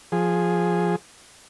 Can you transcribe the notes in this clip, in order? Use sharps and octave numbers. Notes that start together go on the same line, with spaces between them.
F3 G#4